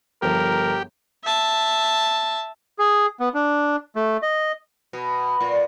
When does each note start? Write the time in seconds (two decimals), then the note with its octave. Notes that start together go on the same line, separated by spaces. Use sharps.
0.22 G1 F3 G4 A#4
1.24 E5 A5
2.79 G#4
3.20 B3
3.34 D4
3.96 A3
4.22 D#5
4.93 B2
5.41 A#2